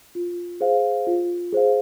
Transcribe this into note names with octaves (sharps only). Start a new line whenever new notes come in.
F4
G#4 C5 F5
F4
G#4 C5 F5